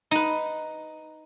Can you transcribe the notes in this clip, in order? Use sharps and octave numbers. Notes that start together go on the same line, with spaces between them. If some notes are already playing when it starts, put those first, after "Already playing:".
D#4 B4